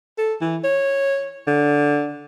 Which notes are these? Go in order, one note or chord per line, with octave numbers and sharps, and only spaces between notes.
A4
E3
C#5
D3